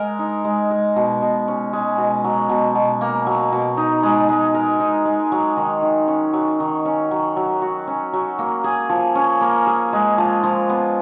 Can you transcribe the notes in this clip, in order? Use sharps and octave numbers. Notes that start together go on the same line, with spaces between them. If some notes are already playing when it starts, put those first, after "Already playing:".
Already playing: G#3 A#4
D#4
G#3
G#3
B2
B2
C#4
G#3
B2
F#3
B2
B2
A#3
F#3
B2
D#4
G#3
G#3
A#4
D#4
G#3
F#3
D#3
D#3
C#4
F#3
D#3
C#4
F#3
F#3
F#4
C#4
F#3
A#3
G#4
F3
C#4
A#3
G#4
G#3
F3
F3
B3